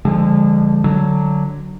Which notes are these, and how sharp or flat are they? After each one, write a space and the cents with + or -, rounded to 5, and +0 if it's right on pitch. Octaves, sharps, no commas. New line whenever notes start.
D3 +0 F3 -5 G#3 -30
D3 +0 F#3 +0